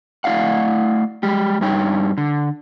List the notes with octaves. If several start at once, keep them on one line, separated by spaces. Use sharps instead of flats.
A3 E4 D5 F5 F#5
G3 G#3 G4
G2 G3 D#4 C#5 G5
D3